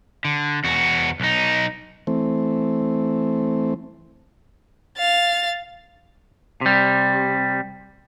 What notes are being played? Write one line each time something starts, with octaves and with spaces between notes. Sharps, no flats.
D3
E2 F#4
B1 D#4
E3 A3 C4
F5 A6
C3 G3